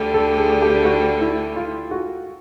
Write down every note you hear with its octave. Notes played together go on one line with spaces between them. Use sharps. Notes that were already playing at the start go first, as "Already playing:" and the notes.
Already playing: D2 D3 G3
A4
G#4
G4
F#4
E4
F4
F#4